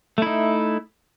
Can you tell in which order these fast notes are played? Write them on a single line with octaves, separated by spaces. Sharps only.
A3 E4 D#4